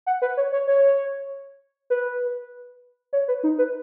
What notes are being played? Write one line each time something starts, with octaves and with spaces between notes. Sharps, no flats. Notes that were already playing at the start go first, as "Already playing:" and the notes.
F#5
B4
C#5
C#5
C#5
B4
C#5
B4
D#4
B4